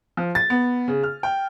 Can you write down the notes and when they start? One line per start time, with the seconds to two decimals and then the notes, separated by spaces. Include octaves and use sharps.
0.17 F3
0.35 A6
0.50 B3
0.88 C#3
1.03 F6
1.23 G5